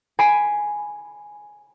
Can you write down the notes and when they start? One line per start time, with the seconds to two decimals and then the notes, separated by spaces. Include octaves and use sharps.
0.19 G#5 B5 C7 D7 D#7